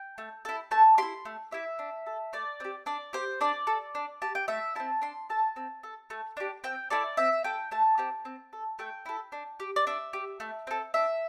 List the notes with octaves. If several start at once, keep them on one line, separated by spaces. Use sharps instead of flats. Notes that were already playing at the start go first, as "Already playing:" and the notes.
Already playing: G5
A3
E4 A4
A3 A5
E4 G4 C6
A3
E4 G4 E5
D4
A4
A3 D5
C4 G4
D4 D5
G4 C5
D4 D5
A4
D4
G4 A5
G5
A3 E5
C4 E4 A5
D4 C6
A4 A5
C4
A4
A3
D4 G4
C4 G5
E4 A4 D5
C4 E5
A4 G5
A3 A5
C4 G4
C4
A4
A3 G5
E4 A4
D4
G4
D5
D4 E5
G4
A3
C4 A4
D4 E5